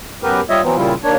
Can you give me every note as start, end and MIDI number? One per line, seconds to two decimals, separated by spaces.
0.23 0.41 42
0.23 0.41 59
0.23 0.41 67
0.23 0.41 70
0.23 0.41 71
0.50 0.61 55
0.50 0.61 65
0.50 0.61 73
0.50 0.61 75
0.50 0.61 76
0.64 0.76 52
0.64 0.76 54
0.64 0.76 59
0.64 0.76 60
0.76 0.94 46
0.76 0.94 49
0.76 0.94 55
0.76 0.94 64
0.76 0.94 65
1.04 1.17 39
1.04 1.17 58
1.04 1.17 62
1.04 1.17 73